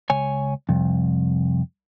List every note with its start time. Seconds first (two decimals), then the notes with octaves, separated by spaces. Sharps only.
0.10 C#2 C#5 G#5
0.69 C2 F2